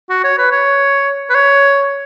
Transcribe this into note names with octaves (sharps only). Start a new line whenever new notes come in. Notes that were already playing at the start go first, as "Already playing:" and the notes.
F#4
C#5
B4
C#5
B4
C#5